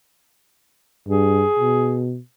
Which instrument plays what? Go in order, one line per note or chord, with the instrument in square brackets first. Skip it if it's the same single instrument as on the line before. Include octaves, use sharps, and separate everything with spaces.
[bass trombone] G2 [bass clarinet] G#4
[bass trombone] B2